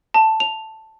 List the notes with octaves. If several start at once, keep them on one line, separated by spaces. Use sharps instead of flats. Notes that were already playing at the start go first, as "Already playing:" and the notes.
A5
F7